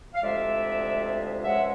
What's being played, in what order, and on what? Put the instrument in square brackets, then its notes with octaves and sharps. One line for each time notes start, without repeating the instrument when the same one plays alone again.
[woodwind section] F5
D2 C3 F3 G#3 D5 E5
C#2 C#3 F3 G#3 E5 F#5